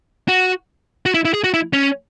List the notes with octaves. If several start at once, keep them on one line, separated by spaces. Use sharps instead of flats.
F#4
F#4
E4
E4
G#4
F#4
E4
C#4